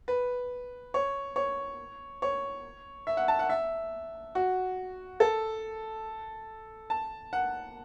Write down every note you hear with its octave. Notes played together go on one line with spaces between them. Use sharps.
B4
C#5
C#5
C#5
E5
F#5
A5
F#5
E5
F#4
A4
A5
F#5